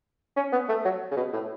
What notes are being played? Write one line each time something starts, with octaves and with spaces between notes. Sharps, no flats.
C#4
B3
A3
F#3
C#3
B2
A2